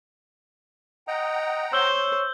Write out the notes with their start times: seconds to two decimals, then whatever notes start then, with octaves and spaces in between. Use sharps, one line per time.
1.08 D#5 F#5 G5 A#5
1.73 C5 C#5 E6 G6 G7